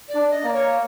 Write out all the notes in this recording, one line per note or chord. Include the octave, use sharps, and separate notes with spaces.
D5
D4
D#5
A#3 D5
C#5